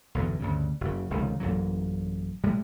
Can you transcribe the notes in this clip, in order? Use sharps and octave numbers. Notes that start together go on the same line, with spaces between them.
B1 E2 G2 D3
D2 G2 C#3
F#1 C#3
F1 C#2 D#3
A1 F#2 A#2 F#3
A2 G3 G#3